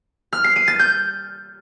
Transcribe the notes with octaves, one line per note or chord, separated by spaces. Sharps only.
F6
C7
D#7
A6
G6